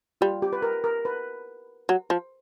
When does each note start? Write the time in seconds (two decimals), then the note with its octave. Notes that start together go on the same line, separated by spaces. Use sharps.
0.21 G3 F4
0.42 G4
0.53 B4
0.62 A#4
0.84 A#4
1.05 B4
1.89 F#3
2.10 F3